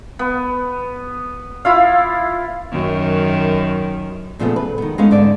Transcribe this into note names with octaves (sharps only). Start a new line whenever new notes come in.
B3
E4 F4 F5
F#2 D#3
A#2 C#3 F3 A3 B3
B4
D#3 B3
G#3 A3 B3 C#4 C#5 F5
G#2 D3 D5